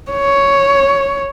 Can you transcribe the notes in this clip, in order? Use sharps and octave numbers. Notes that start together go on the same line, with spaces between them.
C#5